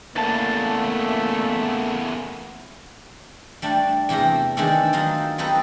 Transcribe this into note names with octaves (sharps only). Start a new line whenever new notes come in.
E2 C#3 A3 A#3 A5 A6
G3 A3 D4
E2 C3 A3 G4 A#5
D#3 G#3 A3 C4 D4 A4
D#3 F#3 D#4 F4 A4
F#3 C4 D#4 A4 B4